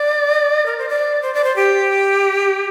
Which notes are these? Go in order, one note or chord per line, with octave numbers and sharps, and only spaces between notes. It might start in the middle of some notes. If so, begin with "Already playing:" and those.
Already playing: D5
A#4
C5
D5
C5
D5
C5
G4